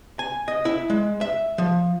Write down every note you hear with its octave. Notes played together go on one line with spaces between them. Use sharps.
G#5
D#5
E4
G#3
E5
F3